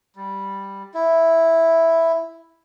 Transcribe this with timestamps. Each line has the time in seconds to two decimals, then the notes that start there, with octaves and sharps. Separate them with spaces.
0.16 G3
0.94 E4